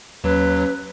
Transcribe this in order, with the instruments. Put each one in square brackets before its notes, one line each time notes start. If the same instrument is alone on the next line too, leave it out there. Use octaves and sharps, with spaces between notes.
[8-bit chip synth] D#2 F#3 [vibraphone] C#4 [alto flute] B4